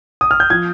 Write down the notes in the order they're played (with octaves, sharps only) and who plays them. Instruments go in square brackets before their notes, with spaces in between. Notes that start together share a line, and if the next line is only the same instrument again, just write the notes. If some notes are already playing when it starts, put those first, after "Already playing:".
[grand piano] D#6
F6
G6
F3 G#6